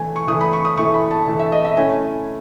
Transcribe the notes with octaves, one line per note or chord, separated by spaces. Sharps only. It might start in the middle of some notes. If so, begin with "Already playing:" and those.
Already playing: E3 A3 E4 G#5
C#6
E3 A3 E4 D#6
B5
C#6
D#6
E3 A3 E4 C#6
B5
A5
E3 A3 E4
E5
D#5
E5
A3 C#4 E4 G#5